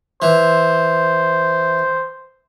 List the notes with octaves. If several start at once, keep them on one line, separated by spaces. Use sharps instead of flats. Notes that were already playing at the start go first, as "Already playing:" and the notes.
E3 C5